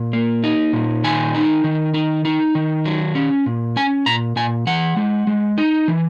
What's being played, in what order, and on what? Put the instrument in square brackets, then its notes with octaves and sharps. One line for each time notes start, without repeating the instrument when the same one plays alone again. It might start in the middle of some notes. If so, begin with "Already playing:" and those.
Already playing: [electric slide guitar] A#2
A#3
D#4
A#2
D#3 G#5
D#4
D#3
D#4
D#4
D#3
F#3
C#4
A#2
C#4 G#5
A#2 A#5
A#2 G#5
E3 F#5
G#3
G#3
D#4
E3